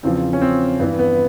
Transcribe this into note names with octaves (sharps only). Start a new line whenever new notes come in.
E2 C#3 F3 C4
C#4
C4
G2 E3 B3
B3